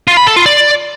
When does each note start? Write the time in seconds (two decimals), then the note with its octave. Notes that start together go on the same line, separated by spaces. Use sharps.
0.08 F4
0.17 B5
0.27 A4
0.36 F4
0.46 D5